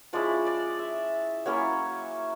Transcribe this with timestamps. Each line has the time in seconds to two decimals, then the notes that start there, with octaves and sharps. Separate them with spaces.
0.13 F3 G#3 C#4 E4 D5
0.46 D5
0.79 E5
1.45 F#3 A#3 C#4 E4 C#5